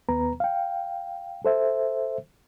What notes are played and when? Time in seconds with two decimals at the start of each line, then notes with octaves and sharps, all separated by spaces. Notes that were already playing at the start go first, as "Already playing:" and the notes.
0.09 D#2 B3 B4 A#5
0.40 F5 G5
1.45 A4 C5 E5